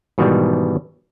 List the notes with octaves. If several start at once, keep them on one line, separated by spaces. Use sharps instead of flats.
G#2 B2 D#3 E3 G3